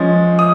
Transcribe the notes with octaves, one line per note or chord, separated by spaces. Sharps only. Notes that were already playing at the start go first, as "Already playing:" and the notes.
Already playing: F3 G#3 C#4
D#6